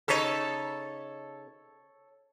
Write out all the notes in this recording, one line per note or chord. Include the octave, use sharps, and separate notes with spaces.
C#3 D#4 A4 C#5